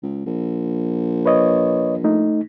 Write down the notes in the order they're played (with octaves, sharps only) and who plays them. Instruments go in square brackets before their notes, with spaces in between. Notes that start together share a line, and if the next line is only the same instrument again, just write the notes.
[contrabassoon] C#2
A#1
[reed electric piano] B4 C#5 D#5
A3 D#4